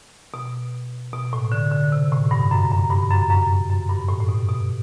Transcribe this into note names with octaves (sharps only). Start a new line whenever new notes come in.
B2
B2
A2
D3
D3
C3
A2
G2
F#2
F#2
G2
F#2
F#2
F#2
G2
A2
A2
B2
B2